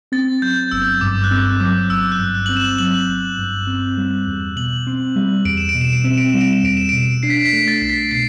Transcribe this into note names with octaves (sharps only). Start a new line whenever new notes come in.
C4 A6
F#3 G6
G1 E6
G2 D6
F#6
C4 E6
F#3 D6
G1 E6
F#6
G2
F#6
C4 F#7
E7
F#3 F#7
G1
G2
C4
G3
E2
B2 F#7
C4
G3
E2 D7
E7
D7
B2
E7
D7
C4 E7
D7
G3 E7
D7
E7
E2 D7
E7
B2 D7
D4 C7
B6
C7
B6
A3
A6
C2
B6
B2 C7